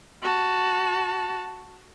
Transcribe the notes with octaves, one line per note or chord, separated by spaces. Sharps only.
F#4 A5